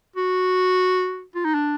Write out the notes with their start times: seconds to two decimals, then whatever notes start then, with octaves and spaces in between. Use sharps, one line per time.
0.16 F#4
1.35 F4
1.44 D#4
1.54 D4